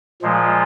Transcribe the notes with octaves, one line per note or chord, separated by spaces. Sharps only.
A#2 F3 G#3